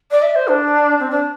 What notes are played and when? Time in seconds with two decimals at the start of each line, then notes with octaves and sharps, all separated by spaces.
0.11 D5
0.22 E5
0.35 C5
0.48 D4
0.99 C4
1.10 D4